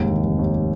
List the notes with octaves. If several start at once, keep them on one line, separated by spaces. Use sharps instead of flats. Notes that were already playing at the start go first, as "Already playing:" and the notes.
Already playing: F1 D#2 G#2
D#3
F1
D#2